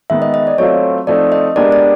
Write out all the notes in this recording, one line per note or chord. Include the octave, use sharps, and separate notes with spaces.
D#3 G#3 B3 E5
D#5
D#5
D5
F#3 A3 C4 F4 C#5
F3 A3 C4 D#4 D5
D#5
G#3 B3 D4 G4 A#4 D5
D5